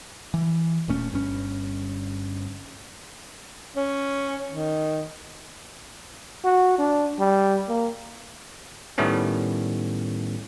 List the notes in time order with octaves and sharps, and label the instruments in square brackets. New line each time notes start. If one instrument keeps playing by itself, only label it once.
[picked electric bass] E3
D#1 A#2 A3 C#4
G1 G2 C#4
[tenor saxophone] C#4
D#3
[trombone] F#4
D4
G3
A#3
[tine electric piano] A2 D#3 G3 A3 B3 C#4